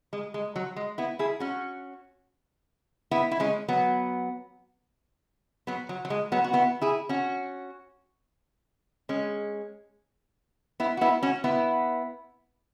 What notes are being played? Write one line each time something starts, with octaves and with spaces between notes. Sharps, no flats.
G#3
G#3
F#3
G#3
B3 E4
E4 G#4
C#4 F#4
B3 E4
E4
G#3 C#4
F#3 B3
F#3 B3
F#3
F#3
G#3
F#3 B3
F#4
B3 E4
E4 G#4
C#4 F#4
G#3 C#4
B3 E4
F#4
B3 E4
C#4 F#4
B3 E4